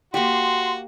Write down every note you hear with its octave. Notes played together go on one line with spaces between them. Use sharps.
A#3 F#4 G4 C6